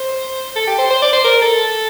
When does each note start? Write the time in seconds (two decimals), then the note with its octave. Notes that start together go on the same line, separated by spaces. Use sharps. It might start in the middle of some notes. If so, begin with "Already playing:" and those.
Already playing: C5
0.56 A4
0.67 G4
0.78 C5
0.90 C5
1.02 D5
1.13 C5
1.24 A#4
1.42 A4